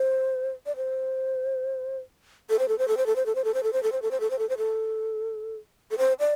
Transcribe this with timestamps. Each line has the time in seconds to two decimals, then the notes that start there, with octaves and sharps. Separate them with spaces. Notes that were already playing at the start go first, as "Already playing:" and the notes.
Already playing: C5
0.66 D5
0.76 C5
2.50 A4
2.59 C5
2.68 A4
2.78 C5
2.88 A4
2.97 C5
3.06 A4
3.16 C5
3.26 A4
3.35 C5
3.44 A4
3.54 C5
3.63 A4
3.73 C5
3.83 A4
3.92 C5
4.02 A4
4.11 C5
4.20 A4
4.30 C5
4.39 A4
4.49 C5
4.58 A4
5.91 A4
5.98 C5
6.20 D5